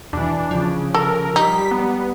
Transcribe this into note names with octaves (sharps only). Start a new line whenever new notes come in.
E2 B2 E3 D4
C#3 F3
A4 A#4
G3 D#4 B6
B3